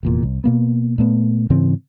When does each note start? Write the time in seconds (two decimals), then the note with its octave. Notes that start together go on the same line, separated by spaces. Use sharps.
0.03 F1 E2 A#2
0.23 C2
0.44 B2 A#3 B3
0.98 A#2 A3 B3
1.50 G#2 C#3 E3 C4